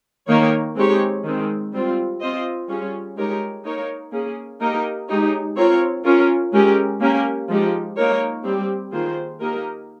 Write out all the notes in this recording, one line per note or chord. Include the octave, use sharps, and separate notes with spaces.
D#3 A#3 D#4 A#4 C#5
G#3 C4 D#4 G4 C#5
D#3 G#3 C4
G3 C4 F4
C4 F4 C5 D#5
G3 C#4 F4 G#4 C#5
G#3 D#4 G4 A#4 C#5
A#3 D#4 A#4 C#5
A#3 C#4 G#4
A#3 D#4 G4 A#4 D#5
G#3 D#4 G4 C#5
C4 F4 A#4 C#5
C#4 F4 A#4 C#5
G#3 C#4 G4 A#4
A#3 C#4 G4 A#4
F3 G#3 D#4 G4
A#3 D#4 A#4 C#5
G3 C4 G4
D#3 A#3 F4 G#4 C5
A#3 D#4 G4 A#4 D#5